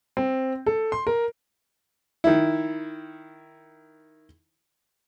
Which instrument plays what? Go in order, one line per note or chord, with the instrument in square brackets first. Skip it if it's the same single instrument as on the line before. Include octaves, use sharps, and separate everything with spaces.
[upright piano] C4
A4
C6
A#4
[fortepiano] D#3 E4